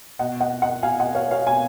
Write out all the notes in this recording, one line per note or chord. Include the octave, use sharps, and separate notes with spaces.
B2 D#5 F#5
D#5 F#5
D#5 F#5
B2 F5 G#5
D#5 F#5
C#5 F5
C#5 F5
B2 F5 G#5